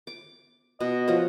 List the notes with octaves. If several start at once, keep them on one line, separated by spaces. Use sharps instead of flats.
D6
B2 D#5
F3 F#4 C#5